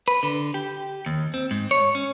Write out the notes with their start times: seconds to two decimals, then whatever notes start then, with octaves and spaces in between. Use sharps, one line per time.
0.08 B4
0.23 D3
0.54 G4
1.06 D#2
1.34 C4
1.51 G#2
1.71 C#5
1.95 C#4